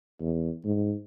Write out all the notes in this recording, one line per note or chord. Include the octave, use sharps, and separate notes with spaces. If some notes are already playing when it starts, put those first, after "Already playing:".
E2
G#2